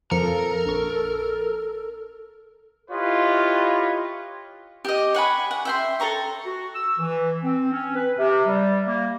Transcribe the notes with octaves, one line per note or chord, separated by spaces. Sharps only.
F2 F3 A4 A#4 C#7
A#1 C#6
E4 F4 G4 B4 C#5 D#5
G4 D#5
C#5 F#5 G#5 B5
F#5
E5 G5 C6
A4 C#5 A#5 C#6
F#4
E6
E3
C4
C#4
B4
C3
G3
A#3